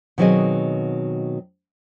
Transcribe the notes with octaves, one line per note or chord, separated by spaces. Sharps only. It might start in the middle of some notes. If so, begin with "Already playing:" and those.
B2 D#3 F#3 C4 G#4 D#5